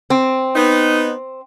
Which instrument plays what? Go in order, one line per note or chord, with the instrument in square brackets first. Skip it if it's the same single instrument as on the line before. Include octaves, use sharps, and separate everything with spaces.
[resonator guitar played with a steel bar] C4
[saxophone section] B3 D#4